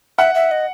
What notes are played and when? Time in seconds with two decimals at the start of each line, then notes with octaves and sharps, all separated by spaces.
0.18 E5 F#5
0.35 E5
0.51 D#5